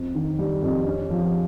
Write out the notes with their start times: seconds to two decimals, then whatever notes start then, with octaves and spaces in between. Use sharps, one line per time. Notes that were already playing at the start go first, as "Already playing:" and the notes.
Already playing: F2 C4
0.15 D#3
0.39 G3
0.62 F2
0.86 C#4
1.10 F3